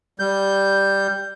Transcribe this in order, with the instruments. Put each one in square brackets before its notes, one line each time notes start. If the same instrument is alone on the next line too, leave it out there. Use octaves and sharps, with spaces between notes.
[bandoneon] G3 G6